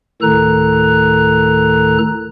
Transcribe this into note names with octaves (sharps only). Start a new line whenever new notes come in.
D2 A2 D#3 A4 A#5 F#6